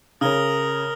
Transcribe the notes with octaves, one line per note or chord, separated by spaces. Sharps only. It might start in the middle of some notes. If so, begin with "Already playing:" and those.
C#3 A#4 C#5 A#5 D#6 F6 G7